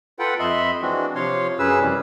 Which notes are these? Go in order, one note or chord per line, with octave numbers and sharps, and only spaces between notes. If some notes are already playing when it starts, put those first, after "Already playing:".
F4 A4 B4 F#5 G5
F2 D#5 E5 B5 C6
E3 G#3 C4 D4 F#4
C3 F3 C#5 F5 C6
F#2 C#3 C#4 G#4 B4 E6
F2 C3 E3 G3